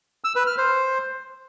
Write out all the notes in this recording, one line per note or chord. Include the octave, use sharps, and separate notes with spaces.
E6
B4
F6
C5